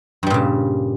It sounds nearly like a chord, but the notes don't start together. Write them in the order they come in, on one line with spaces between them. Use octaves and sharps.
G2 G3 A#2 C#3